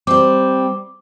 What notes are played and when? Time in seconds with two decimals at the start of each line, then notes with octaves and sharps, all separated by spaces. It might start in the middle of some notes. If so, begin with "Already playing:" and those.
0.07 G3 C4 D6